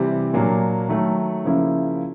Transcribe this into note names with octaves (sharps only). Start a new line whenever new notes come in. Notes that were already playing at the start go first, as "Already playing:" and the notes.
Already playing: C3 E3 G3 C4
A#2 F#3 A#3 D4
D#3 F#3 A3
C#3 F3 A#3 C#4 E4